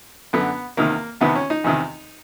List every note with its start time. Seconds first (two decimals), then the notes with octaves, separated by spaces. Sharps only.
0.33 F#2 D3 B3
0.77 E2 C3 D#3 A#3
1.21 E2 C3 D#3 B3
1.35 C#4
1.50 D#4
1.64 E2 C3 D#3